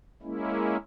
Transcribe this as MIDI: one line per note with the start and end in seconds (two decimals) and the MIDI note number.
0.22 0.77 56
0.22 0.77 58
0.22 0.77 61
0.22 0.77 64